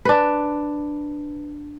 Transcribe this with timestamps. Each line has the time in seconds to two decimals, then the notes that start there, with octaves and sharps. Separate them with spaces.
0.05 D4 B4